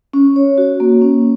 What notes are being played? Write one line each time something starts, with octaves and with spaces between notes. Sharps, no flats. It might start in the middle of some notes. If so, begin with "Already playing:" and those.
C#4
C#5
F#4
A#3
C#4